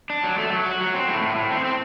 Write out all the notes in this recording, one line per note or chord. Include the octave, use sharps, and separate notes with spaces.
D4
F#3
A3
F#3
F#4
F#3
C4
A2
A2
A2
C4
C4